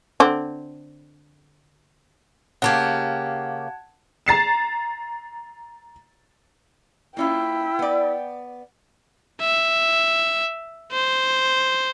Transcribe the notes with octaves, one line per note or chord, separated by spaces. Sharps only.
D3 C4
C#3 A#3 G4 F#5 A5 G#6
A#5 A6 C7 E7
A#3 C#4 E4 F4 G5
B3 D5
E5
C5